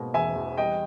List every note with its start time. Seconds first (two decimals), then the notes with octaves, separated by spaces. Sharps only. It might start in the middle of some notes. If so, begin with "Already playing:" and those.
Already playing: G#2 B2 A#3
0.14 E1 E5 G#5
0.36 E2
0.58 G3 D#5 G5